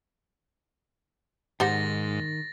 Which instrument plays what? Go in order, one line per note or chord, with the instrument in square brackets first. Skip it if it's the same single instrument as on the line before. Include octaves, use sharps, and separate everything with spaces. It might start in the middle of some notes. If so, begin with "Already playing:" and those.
[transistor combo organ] G#2 [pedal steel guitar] D#3 [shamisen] G4 C5 F#5 [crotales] A6 A#6